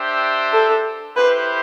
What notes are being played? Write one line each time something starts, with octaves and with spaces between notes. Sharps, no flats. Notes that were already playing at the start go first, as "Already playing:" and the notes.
Already playing: D4 G4 C5 E5 G5
A4
E4 G4 B4 C5